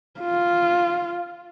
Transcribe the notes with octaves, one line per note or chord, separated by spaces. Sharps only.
F4